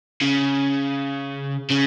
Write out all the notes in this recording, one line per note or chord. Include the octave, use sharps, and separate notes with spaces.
C#3
C#3